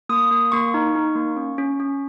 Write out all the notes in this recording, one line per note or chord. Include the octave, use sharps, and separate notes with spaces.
A#3 D#6
A#3
A#3 C#6
D#4
D#4
A#3
C#4
C#4
C#4